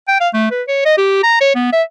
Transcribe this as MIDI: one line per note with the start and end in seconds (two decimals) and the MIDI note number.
0.08 0.19 79
0.20 0.29 77
0.34 0.49 57
0.51 0.63 71
0.68 0.82 73
0.85 0.96 75
0.98 1.21 67
1.23 1.39 82
1.41 1.53 73
1.55 1.70 59
1.72 1.83 76